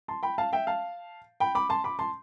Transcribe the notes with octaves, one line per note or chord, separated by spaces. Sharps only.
A5 C6
G5 B5
F5 A5
E5 G5
F5 A5
G5 B5
B5 D6
A5 C6
B5 D6
A5 C6